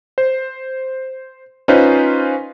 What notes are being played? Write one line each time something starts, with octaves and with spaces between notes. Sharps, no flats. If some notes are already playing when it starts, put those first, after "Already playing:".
C5
C#4 D#4 F4 B4 C5